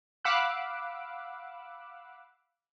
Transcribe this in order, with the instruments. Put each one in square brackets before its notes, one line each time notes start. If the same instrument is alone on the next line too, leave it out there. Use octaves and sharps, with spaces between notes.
[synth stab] F5 F#5 B5 D6 E6 F#6